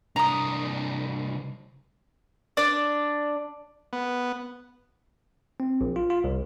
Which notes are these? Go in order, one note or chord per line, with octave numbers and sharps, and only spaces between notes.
C2 D4 A#5 D#6
D4 D5
B3
C4
A#1
F4
F4
C2